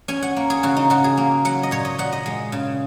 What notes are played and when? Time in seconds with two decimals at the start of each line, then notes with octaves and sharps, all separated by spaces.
0.08 C#4 G#5
0.22 F#5
0.36 A#3
0.50 G#4
0.63 C#3 F#4
0.76 D#4
0.90 C#3 F#4
1.04 G#4
1.17 A#3
1.45 F#3 F#5
1.63 D#5
1.71 A#2 C#5
1.85 D#5
1.98 A#2 F#5
2.13 D#5
2.26 G#3
2.52 C#3